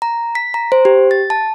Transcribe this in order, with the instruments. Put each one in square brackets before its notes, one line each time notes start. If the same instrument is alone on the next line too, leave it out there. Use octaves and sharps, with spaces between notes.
[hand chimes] A#5
B6
A#5
C5
G4
A6
A5